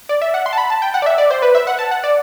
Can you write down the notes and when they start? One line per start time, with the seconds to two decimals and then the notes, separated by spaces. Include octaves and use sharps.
0.09 D5
0.22 E5
0.34 F#5
0.46 C6
0.53 A5
0.58 B5
0.70 A5
0.82 G5
0.94 F#5
1.02 D5
1.06 E5
1.18 D5
1.30 C5
1.42 B4
1.55 E5
1.67 F#5
1.79 A5
1.91 F#5
2.04 D5